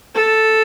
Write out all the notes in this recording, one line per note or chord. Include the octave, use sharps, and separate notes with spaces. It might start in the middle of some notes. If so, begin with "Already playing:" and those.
A4